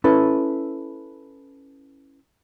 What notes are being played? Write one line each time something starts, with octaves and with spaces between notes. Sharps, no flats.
C#4 E4 A4 B4